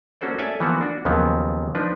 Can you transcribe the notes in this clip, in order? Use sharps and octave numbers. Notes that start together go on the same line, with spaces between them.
A#3 C#4 F#4 A4 C5 D5
A4 C#5 D5 E5 G#5 A5
E3 F3 A#3 B3 F#4
D4 F#4
D#2 C#3 F3 F#3 B3
F3 D4 D#4 B4